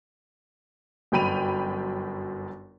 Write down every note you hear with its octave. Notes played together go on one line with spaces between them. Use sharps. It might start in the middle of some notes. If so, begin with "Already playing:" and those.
G1 F#2 G5 B5 D#7 F7